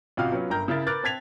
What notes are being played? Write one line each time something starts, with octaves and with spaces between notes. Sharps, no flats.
A1 C3 F4 F#4 F5 F6
F#3 B3 C#4 F4
G1 G2 A#4 A#5 G6
C#3 E4 A#4 E5 A6
A#4 B4 D6 F6 F#6 A6
C4 A5 G#6 B6 F7